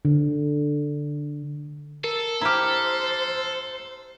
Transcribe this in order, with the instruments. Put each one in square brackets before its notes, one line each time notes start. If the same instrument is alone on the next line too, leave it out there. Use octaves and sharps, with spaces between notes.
[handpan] D3
[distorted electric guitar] A4 [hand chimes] A#4
[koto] E4 G4 [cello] C5 [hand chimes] A#5 F6